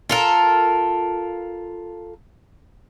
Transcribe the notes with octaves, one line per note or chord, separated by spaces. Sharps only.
F4 A4 A#4